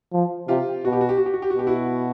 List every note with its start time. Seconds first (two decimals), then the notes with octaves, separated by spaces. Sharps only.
0.13 F3
0.48 C3 F4 G4
0.85 B2 F#4
0.92 G4
1.01 F#4
1.09 G4
1.17 F#4
1.26 G4
1.34 F#4
1.42 G4
1.50 F#4
1.56 B2 G4
1.67 E4 F#4